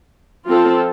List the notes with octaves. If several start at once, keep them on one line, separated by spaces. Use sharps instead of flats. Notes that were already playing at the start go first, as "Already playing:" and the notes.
F3 C4 F4 A4